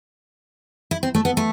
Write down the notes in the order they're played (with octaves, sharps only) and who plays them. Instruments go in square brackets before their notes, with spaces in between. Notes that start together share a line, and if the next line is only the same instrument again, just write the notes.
[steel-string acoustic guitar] E4
C4
A3
B3
A3